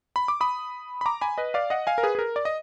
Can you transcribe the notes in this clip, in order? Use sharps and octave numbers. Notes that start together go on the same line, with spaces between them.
B5
D6
B5 D#6
B5
A#5 D6
G#5 B5
B4 D#5
D5 F5
D#5 F#5
F5 G#5
A#4
G#4 B4
G#4
A#4
D5
D#5